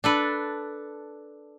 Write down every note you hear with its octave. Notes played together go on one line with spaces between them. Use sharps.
D4 A4 B4